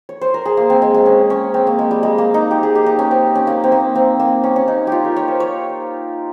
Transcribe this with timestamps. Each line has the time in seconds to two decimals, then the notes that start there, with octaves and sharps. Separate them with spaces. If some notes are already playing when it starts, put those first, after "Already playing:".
0.09 C#5
0.21 C5
0.34 A#4
0.46 G#4
0.57 A#3
0.70 C4
0.82 G#3
0.94 G#3
1.06 C#4
1.30 C#4
1.54 C4
1.67 A#3
1.79 G#3
1.91 G3
2.03 G#3
2.18 A#3
2.34 D#4
2.51 G4
2.63 G#4
2.75 G4
2.86 D#4
2.99 C#4
3.11 C4
3.35 C#4
3.47 A#3
3.64 C4
3.72 A#3
3.95 C4
4.20 A#3
4.44 C#4
4.56 C#4
4.68 D#4
4.87 F4 G4
5.04 A#4
5.16 C#5
5.28 C5
5.40 C#5